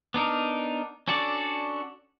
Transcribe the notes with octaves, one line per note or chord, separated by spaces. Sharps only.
B3 D4 D#4 A#4
C#4 D4 F#4 A4 D5